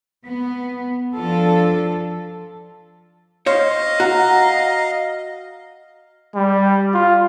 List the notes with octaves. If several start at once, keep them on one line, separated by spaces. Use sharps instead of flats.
B3
F3 D4 F4 A4
C5 C#5 D#5 F5
F#4 A#5
G3
F4